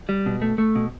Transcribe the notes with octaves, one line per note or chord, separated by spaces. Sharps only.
G3
B2
A3
A3
B2